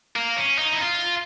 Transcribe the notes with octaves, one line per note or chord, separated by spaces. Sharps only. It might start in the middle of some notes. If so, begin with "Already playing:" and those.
A#3
C#4
D#4
E4
F4